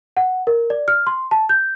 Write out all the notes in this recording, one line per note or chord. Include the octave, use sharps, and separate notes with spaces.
F#5
A#4
D5
F6
C6
A5
G6